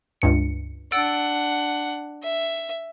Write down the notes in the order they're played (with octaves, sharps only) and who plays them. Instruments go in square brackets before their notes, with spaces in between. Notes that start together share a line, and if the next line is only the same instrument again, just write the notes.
[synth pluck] C#2 G2 C#7
[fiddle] D4 F#5 [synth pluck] E6 A6 D7
[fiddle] E5